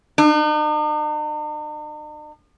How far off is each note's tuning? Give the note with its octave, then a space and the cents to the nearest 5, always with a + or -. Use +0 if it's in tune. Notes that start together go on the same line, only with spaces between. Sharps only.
D#4 -45